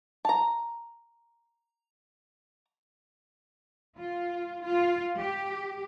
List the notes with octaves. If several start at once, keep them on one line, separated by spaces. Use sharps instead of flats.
A5 A#5
F4
F4
G4